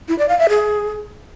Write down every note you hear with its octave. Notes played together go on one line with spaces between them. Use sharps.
E4
D5
F5
E5
G#4